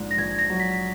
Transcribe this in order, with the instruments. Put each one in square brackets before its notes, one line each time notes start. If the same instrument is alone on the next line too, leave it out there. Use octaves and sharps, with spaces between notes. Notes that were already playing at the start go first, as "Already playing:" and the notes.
Already playing: [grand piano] A#1 G#2
[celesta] A#6
[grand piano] A#1 [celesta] G#6
[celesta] A#6
[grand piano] F#3
[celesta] B6